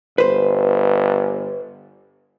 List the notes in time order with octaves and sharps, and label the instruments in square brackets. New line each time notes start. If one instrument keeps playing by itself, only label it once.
[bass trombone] G1 [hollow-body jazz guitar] B4 C5